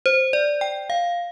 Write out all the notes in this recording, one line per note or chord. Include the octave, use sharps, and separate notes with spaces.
C5
D5
G5
F5